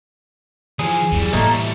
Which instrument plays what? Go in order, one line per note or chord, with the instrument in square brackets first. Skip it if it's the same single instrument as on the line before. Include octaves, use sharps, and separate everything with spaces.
[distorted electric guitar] E3 F3 [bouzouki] G#4 G#5
[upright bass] E2 F#3 [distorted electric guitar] E3 G3
[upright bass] A2 [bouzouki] A3 A#3 D#4
[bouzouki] A3